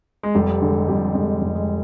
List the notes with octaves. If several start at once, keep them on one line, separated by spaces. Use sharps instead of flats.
G#3
F1 G3
D3 G#3
F2 G3
F1 G#3
F1
G#3